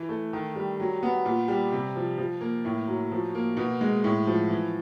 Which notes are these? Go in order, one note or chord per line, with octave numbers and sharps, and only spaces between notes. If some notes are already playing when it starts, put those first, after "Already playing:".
Already playing: E3
A3
D#3
G3
F#3
B3
A#2
G3
C3
F3
F3
A#3
A2
F#3
F3
A#3
B2
G#3
A2
F3
E3